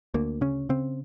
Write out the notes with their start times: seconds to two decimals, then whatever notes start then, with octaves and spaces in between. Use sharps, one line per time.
0.14 D2 A#3
0.41 C#3 C#4
0.69 C#3 C4